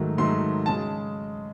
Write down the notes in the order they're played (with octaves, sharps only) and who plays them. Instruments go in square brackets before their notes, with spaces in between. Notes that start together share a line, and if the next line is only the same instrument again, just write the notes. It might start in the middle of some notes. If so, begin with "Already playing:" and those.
Already playing: [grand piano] G#2 D#3 F#3 A3
G#2 D#3 F#3 A3 C6
C#3 G#3 A5